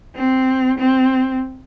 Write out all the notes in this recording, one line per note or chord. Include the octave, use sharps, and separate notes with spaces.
C4
C4